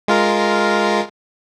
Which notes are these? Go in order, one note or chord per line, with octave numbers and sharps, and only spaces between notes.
G#3 F4 A#4